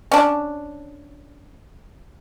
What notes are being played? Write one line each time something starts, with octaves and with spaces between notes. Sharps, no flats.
C#4 D4